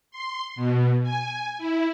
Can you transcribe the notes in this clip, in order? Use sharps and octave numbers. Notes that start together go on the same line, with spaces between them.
C6
B2
G#5
E4